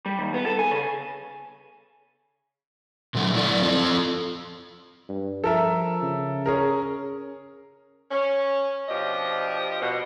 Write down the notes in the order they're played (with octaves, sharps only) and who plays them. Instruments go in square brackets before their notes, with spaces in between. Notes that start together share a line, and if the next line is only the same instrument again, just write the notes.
[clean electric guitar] G3
D#2
B3
A4
G#5
C#3
[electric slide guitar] A#2 D3 F#3 A3
F#3 A3 E4 D5
F3 C4 F4 A4
[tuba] G2
[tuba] F3 [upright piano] A4 A#4 E5
[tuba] C#3
[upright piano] C#4 G#4 A#4
[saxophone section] C#4
B2 F3 D4 G4 D#5
B2